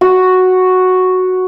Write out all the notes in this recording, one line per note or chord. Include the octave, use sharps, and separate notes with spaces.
F#4